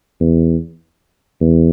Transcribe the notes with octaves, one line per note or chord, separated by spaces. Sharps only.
E2
E2